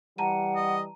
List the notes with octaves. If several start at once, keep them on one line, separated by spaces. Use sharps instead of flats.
E3 G3 F#5 A5 A#5 D#7
D#5